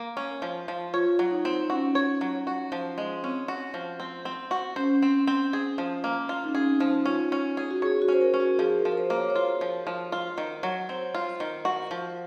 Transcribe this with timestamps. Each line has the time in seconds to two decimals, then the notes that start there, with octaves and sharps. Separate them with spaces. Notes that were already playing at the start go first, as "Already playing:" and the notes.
Already playing: A#3
0.17 C#4
0.42 F3
0.68 F3
0.94 F4 C#5
1.19 F#3
1.31 D#4
1.45 C4
1.70 C#4 F#4
1.95 C#5
2.21 F#3
2.47 F#4
2.72 F3
2.98 G#3
3.23 C4 C#4
3.48 F#4
3.74 F3
4.00 C4
4.25 C4
4.51 F#4
4.76 C#4 C5
5.02 C4
5.27 C4
5.53 G#4
5.78 F3
6.04 A#3
6.29 F4
6.44 D#4
6.49 C#4
6.55 G#4
6.68 C4
6.80 F3
6.87 D#4
7.06 C#4 F4
7.32 C#4
7.57 G#4
7.71 F#4
7.82 G#4 C#5
8.02 F#4
8.08 C#4 C5
8.21 A#4
8.34 C#4
8.40 F#4
8.59 F3 G#4
8.79 A#4
8.85 F3
8.92 A#4
8.97 C5
9.10 A#3
9.16 C#5
9.30 C#5
9.36 F4 C5
9.61 F3
9.87 F3
10.12 F4
10.38 D#3
10.63 F#3
10.89 C4 C5
11.14 F4
11.40 D#3
11.65 F#4
11.91 F3